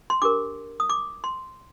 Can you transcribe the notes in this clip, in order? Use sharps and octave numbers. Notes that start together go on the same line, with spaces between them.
C6
D4 G4 A#4 D6
D#6
D6
C6